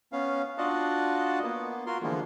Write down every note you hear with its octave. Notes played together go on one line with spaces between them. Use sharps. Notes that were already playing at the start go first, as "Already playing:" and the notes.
B3 C#4 F5
D4 F4 F#4 D#5 F#5 A5
A#3 B3
F4 F#4 A#4 C6
D3 E3 F3 G#3 A#3 B3